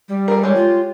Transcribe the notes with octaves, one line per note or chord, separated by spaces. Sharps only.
G3
G#4 A#4
G#3 G4 C#5
F4